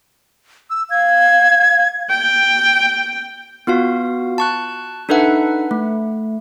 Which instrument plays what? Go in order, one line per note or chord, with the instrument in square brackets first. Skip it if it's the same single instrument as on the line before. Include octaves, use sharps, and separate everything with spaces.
[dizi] E6
[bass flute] F5 [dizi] G#6
[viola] G5
[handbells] B3 F4 F#4 F5
A5 C#6 F#6
D4 D#4 A4 B4 E5 F#5
A3